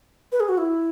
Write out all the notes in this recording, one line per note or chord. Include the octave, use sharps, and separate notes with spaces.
B4
G#4
F#4
E4